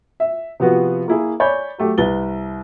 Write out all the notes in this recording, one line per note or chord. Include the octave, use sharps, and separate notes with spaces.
E5
C3 F3 B3 F#4
A#3 E4 G#4
C#5 D5 G#5 B5 G6
F#3 A3 G4
C2 B4 A6 G7